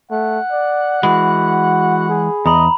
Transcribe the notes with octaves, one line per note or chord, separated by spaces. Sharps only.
A3 F#5
D5
E3 G#3 F#4 B5
G#4
E2 D#5 A#5 B5